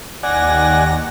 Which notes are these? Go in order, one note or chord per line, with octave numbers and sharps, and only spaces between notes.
D#2 D#3 D5 F#5 G#5 A#6